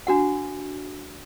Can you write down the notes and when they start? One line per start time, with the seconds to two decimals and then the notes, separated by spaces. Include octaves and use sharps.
0.07 D4 F#4 F#5